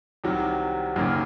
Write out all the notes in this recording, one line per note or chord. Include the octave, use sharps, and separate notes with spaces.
C2 C3 D#3 F#3
F#1 F#2 D#3 A#3 C#4